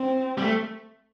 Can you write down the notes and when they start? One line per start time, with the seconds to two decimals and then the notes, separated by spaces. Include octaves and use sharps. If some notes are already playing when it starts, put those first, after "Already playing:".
Already playing: C4
0.38 G3
0.42 A3